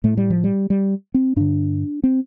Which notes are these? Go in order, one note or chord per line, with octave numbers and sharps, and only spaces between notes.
A2 A3
G3
F3
G3
G3
C4
G2 D3 D4
C4